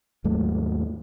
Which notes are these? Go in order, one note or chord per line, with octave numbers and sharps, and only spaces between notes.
D#2 G#2 F#3 A3